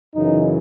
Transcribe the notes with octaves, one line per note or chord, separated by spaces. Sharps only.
F#2 C#3 E3 D#4